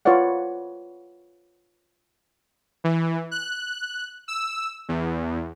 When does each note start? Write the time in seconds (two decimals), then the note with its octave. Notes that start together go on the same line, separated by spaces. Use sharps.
0.05 F4 B4 C#5 D5 F#5
2.84 E3
3.31 F#6
4.28 E6
4.89 E2